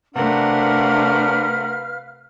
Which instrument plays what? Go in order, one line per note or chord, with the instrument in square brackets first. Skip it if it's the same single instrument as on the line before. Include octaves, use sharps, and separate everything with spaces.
[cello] C3 A3 [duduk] D4 [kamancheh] A#4 F#5 [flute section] B4 F5 F6